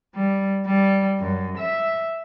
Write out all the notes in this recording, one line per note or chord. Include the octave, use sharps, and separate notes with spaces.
G3
G3
F#2
E5